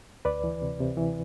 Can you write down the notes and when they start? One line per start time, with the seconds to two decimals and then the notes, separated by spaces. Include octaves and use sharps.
0.25 D2 B4 D5
0.44 E3
0.62 C3
0.80 C3
0.97 E3